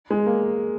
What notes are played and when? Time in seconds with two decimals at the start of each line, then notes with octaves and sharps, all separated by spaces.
0.10 G#3
0.26 A#3